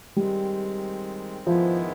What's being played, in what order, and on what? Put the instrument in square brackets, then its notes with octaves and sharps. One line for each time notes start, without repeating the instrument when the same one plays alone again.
[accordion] D#3 G#3 C4 [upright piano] G3
[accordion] G#2 D#3 G#3 B3 E4 [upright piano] F3